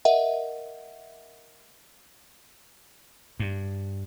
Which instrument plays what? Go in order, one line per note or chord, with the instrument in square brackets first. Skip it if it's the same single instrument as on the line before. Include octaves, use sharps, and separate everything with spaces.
[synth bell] A#4 D#5 E5 F#5
[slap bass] G2